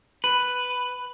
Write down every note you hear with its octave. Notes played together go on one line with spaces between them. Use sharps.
B4